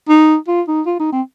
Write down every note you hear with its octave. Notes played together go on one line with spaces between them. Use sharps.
D#4
F4
D#4
F4
D#4
C4